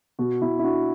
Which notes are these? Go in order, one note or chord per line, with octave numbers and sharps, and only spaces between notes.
B2 F#4
B2 E4
E4
D4 F#4